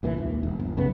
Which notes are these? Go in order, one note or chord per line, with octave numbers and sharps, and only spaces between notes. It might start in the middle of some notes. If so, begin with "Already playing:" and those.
C2 A#2 D#3 E3
G#1 D#2
E1
G1
B1 F#2 C#3 B3